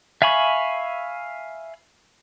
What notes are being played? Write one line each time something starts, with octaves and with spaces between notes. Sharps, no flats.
E5 F5 G#5 B5 C#6